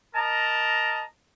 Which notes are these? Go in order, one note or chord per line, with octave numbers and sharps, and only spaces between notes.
A#4 D#5 A5 A#5